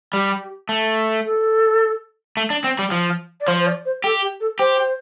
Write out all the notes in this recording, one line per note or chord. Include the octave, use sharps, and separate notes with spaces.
G3 G4
A3
A4
A3
D4
C4
G3
F3
D5
F3 C5
C5
D5
C5
G4 A4
G4
A4
G4 C5